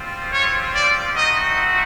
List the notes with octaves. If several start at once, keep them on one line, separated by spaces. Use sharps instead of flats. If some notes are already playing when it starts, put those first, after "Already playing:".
Already playing: G3 C4 F4
C#5
D5
A3 C4 D#4 F#4 D#5